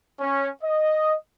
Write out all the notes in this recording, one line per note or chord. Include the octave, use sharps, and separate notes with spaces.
C#4
D#5